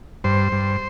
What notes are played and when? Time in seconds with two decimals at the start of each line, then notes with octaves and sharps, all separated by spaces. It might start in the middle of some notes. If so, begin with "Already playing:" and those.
0.24 G2 C5
0.52 G2